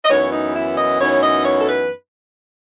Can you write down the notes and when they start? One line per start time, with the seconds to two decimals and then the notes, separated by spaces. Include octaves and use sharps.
0.04 D#5
0.09 F#2 E3 B3 D#4 C#5
0.31 D#4
0.54 E4
0.77 D#5
1.00 F#2 E3 B3 D#4 C#5
1.22 D#5
1.45 C#5
1.59 A4
1.68 B4